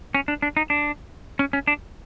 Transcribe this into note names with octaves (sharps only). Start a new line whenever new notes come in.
C#4
D4
D4
D#4
D4
C#4
C#4
D4